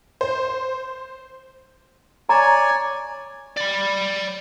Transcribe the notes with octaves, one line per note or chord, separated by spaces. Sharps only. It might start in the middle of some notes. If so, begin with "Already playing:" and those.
C5
C#5 D5 G#5 A#5
D5 B5